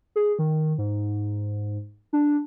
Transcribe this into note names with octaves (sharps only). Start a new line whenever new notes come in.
G#4
D#3
G#2
D4